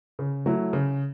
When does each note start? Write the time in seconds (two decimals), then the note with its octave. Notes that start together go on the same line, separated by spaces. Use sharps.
0.19 C#3
0.46 F#3 A3 E4
0.73 C#3